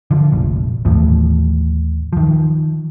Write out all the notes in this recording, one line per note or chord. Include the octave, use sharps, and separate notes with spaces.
D3 F3
F1 A#1
A1 D#2 A2 F3
D#3 F3